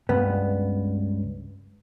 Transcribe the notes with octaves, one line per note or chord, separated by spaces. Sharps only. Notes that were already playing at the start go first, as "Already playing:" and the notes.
C#2 G2 B3